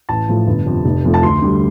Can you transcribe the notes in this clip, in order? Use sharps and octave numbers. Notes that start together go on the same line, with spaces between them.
A1 A5
A2 F3 A3
G1
F2 C3
F1
F2 F3 A3
A5
D2 C6
D3 G3